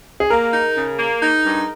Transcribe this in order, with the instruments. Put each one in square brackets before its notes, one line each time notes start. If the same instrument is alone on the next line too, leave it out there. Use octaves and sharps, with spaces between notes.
[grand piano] G#4
[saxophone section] A#3 [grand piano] A#4
[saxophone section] D#4
C#3
A#3
D#4
G2